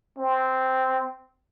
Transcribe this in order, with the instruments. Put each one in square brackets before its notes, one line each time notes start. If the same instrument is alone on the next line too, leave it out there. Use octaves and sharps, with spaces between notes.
[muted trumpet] C4